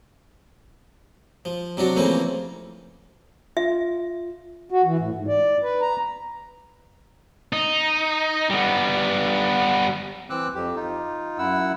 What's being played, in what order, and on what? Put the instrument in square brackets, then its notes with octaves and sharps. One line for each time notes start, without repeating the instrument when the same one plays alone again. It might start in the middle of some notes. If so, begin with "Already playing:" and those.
[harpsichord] F3
C3 F#3 D4 F#4
C#3 E3 F3 A3 A#3 C4
[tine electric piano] F4 [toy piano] E5
[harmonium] F#4
E3
A2
G#2
D5
B4
A#5
[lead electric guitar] D#4
G3 B3
[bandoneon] E3 C4 D6 E6 F#6
F2 G4
D#4 F4
F#2 E4 F#5 E6